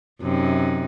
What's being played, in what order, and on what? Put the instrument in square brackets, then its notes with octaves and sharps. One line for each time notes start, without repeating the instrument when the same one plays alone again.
[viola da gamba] F#2 C3 D#4